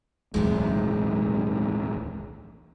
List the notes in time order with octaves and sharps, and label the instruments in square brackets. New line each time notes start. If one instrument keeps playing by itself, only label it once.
[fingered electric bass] D1 B1 E2 [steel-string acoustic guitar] C3 D#3 G#3